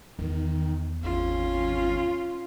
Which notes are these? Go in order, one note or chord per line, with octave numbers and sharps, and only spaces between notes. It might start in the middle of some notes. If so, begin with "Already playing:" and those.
E2 D#3
G#1 C#4 F4